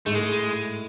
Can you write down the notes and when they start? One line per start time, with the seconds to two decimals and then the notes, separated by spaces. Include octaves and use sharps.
0.06 G#2 A3
0.15 A2 G#3